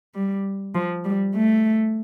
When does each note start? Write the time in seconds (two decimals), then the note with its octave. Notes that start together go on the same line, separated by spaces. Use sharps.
0.15 G3
0.75 F3
1.05 G3
1.35 A3